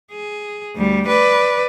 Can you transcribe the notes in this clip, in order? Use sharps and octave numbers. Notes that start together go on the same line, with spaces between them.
G#4
D2 G3
B4 D5